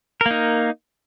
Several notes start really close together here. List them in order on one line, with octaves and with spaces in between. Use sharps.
A#4 A#3 D#4